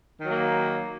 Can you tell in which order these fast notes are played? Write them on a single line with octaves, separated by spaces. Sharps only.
D#3 F#3 A#3